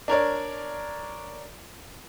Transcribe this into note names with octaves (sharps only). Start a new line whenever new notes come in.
D4 A#4 C#5 D5